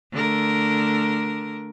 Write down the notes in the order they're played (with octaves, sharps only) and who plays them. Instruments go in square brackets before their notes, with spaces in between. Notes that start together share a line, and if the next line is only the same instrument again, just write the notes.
[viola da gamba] D3 A3 A#4